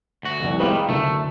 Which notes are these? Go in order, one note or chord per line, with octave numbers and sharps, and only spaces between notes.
D2 F#4
F1 C2
D#3 G3 G#3 F4 B4
F#1 D2 A3